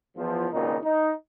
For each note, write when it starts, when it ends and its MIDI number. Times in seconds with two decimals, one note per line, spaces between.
0.17 0.47 40
0.17 0.47 53
0.52 0.76 32
0.52 0.76 37
0.52 0.76 46
0.52 0.76 49
0.52 0.76 63
0.83 1.11 63